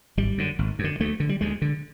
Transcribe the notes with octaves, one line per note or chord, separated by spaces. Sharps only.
G#1 G3
F#2 D3
G#1
F#2
D3
D2 A3
D3
G3
D2 G#3
D3